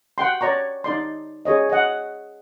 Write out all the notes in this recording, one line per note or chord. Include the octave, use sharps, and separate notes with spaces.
F#5 G5 C6
C#5 D5 A#5 C#6
D#4 D5 C6
G#4 C#5 D#5
D#5 F#5